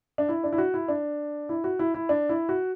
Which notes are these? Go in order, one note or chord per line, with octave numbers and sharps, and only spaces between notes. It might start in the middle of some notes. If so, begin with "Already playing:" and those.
D4
E4
D4
E4
F#4
E4
D4
E4
F#4
E4
E4
D4
E4
F#4